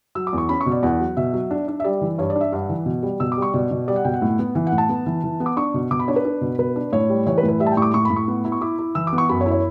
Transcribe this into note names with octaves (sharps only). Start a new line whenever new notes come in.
F#3 E6
D6
E2
C#6
C#4 B5
C#6
B2
D5
E2 F#5
F#3
B2 E5
F#3
D4
D4
E5
G3 D5
E3
G2 C#5
D5
D4
E5
G2 F#5
E3
B2
G3
B2 E6
D6
G3 C#6
B2 D5
B2
G3 D5
F#5
B2 G5
F#5
A2
B3
E3
F#5
A2
A5
B3
E3
E3
B3
D6
D4 C#6
B2
B2 D6
B5
D4 C#5
B4
D4
B2
B2 B4
D4
A2 C#5
G3
E3 C#5
B4
A2
B4
G3 E5
A5
G5
A2 C#6
D6
A2 C#6
B5
A2
C#6
B3
E4
C#6
E4 D6
E4
E3 E6
D6
B3
C#6
F#2 B5
C#5
E4
C#5